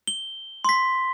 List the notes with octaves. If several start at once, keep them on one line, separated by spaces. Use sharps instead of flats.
G7
C6 B6